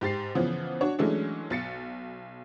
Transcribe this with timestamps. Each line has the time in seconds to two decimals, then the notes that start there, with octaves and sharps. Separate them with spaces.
0.01 G#2 G4 A6 C7
0.35 C#3 E3 F3 B3
0.81 D4 F#4 C#5
0.99 E3 F#3 G#3 A3 C#4 D4
1.50 B1 A6 C#7